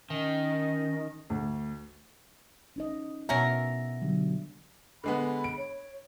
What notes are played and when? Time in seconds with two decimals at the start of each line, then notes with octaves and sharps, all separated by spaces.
0.10 D#3 C#4 D#5
1.30 D2
2.76 C#4 D#4 D#5
3.29 B2 B3 C#4 F#4 A#4 E5
4.02 D3 F#3 G3
5.04 D3 G#3 B3 B5
5.44 D7
5.58 C#5